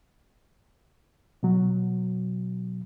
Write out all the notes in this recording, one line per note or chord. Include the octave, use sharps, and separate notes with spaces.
B2 F#3